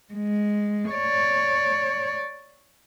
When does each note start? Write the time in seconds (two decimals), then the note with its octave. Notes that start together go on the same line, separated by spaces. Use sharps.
0.14 G#3
0.92 C#5 D5